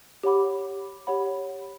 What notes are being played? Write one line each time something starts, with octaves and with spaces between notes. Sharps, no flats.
G4 C#5 F#5 B5 D6
G4 C#5 F#5 B5